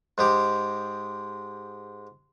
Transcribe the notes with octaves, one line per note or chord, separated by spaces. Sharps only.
G#2 G#3 G4